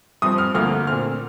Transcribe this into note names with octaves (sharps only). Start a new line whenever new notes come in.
G2 F3 C4 D#6
F6
D2 D3 F3 A#3 F6
A#2 A3 C4 F6